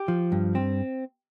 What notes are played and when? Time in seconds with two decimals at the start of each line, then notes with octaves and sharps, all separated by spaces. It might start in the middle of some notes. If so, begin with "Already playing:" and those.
Already playing: G4
0.08 F3
0.32 G2
0.55 C4